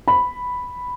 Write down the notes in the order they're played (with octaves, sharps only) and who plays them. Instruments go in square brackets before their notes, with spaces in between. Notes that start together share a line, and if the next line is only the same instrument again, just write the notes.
[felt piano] B5